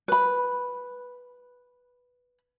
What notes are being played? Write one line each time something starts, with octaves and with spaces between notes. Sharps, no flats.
B4 B5